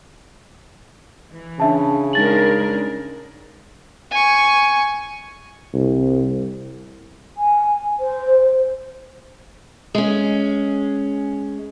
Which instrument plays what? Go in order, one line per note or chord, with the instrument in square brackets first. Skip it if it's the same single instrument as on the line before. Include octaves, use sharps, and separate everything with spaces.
[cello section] E3
[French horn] C#3 [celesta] D4 E5 A5
[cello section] G#3 D4 A#4 [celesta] D#4 A6 F#7
[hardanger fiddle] G#5 C#6
[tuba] C2
[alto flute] G#5
C5
[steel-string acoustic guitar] G#3 C#4